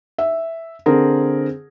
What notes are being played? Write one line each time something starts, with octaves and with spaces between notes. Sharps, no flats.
E5
D3 C4 G#4 A#4